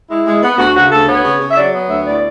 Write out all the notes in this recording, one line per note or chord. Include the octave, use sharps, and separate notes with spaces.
G#3 E4
G#3
B3
D2 F#4
C#3 F#4
D2 A4
B3 C#5
C#3
C#3
E5
F#3 D5
B3
D2 E5
A2 D5